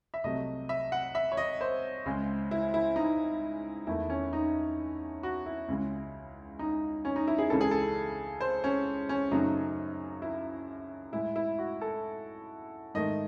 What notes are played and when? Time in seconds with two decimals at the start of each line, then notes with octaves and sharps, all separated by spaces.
0.14 E5
0.24 C2 C3 F#3 A3 D#5
0.69 E5
0.92 F#5
1.15 E5
1.32 C#5
1.37 D#5
1.61 C5
2.06 C#2 C#3 G#3
2.51 E4
2.74 E4
2.96 D#4
3.87 E2 D#3 A3 E4
4.10 C#4
4.33 D#4
5.23 F#4
5.46 E4
5.68 C#2 C#3 G#3
6.59 D#4
7.05 C#4
7.16 D#4
7.27 E4
7.38 G#4
7.50 C#2 C#3 E3 A4
7.61 G#4
7.71 A4
8.40 C5
8.64 C#4
9.09 C#4
9.31 F#2 C#3 F#3 A3 D#4
10.22 E4
11.13 A2 G#3 E4
11.36 E4
11.59 F#4
11.81 A4
12.94 G#2 D#3 A3 D#5